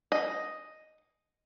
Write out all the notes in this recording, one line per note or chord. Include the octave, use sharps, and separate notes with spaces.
D#5